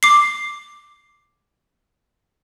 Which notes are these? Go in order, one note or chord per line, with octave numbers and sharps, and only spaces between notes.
D6 C7